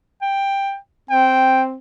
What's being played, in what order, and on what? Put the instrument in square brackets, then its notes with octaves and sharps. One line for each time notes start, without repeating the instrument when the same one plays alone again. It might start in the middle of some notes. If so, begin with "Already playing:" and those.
[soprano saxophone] G5
[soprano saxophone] C4 [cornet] G5